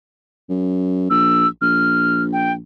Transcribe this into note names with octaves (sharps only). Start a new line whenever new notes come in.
F#2
A#1 E6
A#1 F6
G5